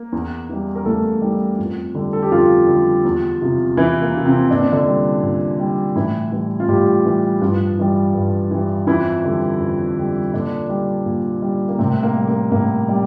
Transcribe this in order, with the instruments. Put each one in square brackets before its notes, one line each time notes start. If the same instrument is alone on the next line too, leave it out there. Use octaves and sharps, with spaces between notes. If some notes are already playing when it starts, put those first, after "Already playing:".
Already playing: [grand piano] A#3
E2
E3 G3
A#4
E2 A3 A4
E3 G3
F2
D3 G3
A4
G4
F2 F3 F4
D3 G3
E2
C3 F3
E2 E3 E4
A#3
C3
F3
C3 C4
A#2 D4
C4
D3 D4
G3
A#2
G3
A2 E3 E4
E3 G3
F4
A2 G3 G4
E3 G3
G2 F3 F4
E3 G3
G2
E3 G3
F2 E3 E4
D3 G3
F2
D3 G3
A#2 D3 D4
G3
A#2
G3
A#3
A2 C3 C4
A#3
G3
A#3
A2 A#3
G3